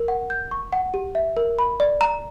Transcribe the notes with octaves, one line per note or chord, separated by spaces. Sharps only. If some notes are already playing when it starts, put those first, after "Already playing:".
Already playing: A#4
F#5
G6
C#6
F#5
G4
E5
A#4
B5
D5
A#5